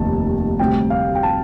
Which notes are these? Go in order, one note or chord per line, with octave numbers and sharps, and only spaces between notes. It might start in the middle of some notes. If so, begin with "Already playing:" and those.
Already playing: F1 D#2 A5
D2 C3 G3 G5
F5
G5
A5